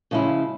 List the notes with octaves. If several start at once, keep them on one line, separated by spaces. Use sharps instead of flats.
C#3 F3 G#3 C#4 E4